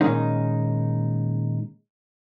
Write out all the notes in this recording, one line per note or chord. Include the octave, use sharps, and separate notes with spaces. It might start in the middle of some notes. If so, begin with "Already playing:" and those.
A#2 D#3 G#3 C#4 D#4